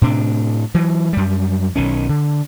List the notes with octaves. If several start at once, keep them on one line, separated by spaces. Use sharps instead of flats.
A2 C3 D4
E3 F#3
F#2 G3
B1 D#3 C#4
D3